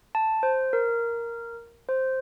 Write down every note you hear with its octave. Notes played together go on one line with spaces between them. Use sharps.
A5
C5
A#4
C5